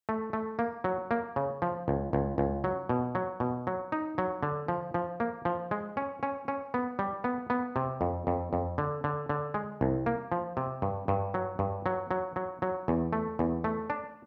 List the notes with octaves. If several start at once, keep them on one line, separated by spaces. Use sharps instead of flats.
A3
A3
A#3
F#3
A#3
C#3
F3
C#2
C#2
C#2
F#3
B2
F#3
B2
F#3
D#4
F#3
D3
F3
F3
A#3
F3
G#3
C#4
C#4
C#4
B3
G3
B3
B3
C3
F2
F2
F2
D3
D3
D3
G#3
C2
A#3
F3
C3
G2
G2
F#3
G2
F#3
F#3
F#3
F#3
E2
A3
E2
A3
D4